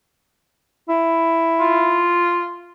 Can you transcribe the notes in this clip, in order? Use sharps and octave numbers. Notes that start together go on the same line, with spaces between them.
E4
F4